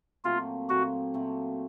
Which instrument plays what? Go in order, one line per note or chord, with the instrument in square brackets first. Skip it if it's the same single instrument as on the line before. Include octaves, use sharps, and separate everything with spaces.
[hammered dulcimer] A#2 F#3 A3 C4 [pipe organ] F4
[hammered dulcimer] A#2 F#3 A3 C4 [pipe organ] F#4
[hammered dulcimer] A#2 F#3 A3 C4